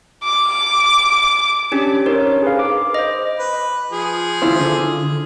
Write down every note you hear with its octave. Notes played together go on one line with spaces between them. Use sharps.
D6
C#4 D4 G4
D#4 A#4 C5 C#5
G#4 B4 F5
D6
C5 D#5
B4
F3 G#4
E4 F4 C5
D3